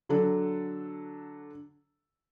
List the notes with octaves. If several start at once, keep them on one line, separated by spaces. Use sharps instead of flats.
D3 F#3 D4 A4